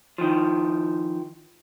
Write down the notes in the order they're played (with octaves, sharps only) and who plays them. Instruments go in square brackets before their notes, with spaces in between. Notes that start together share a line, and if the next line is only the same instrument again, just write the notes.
[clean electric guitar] D#3 F3